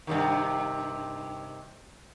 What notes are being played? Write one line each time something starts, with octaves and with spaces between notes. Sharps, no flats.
G2 C3 D#3